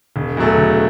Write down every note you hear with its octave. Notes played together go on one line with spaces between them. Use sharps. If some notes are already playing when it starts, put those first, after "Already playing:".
E1
E2 B2 F#3 A3
E1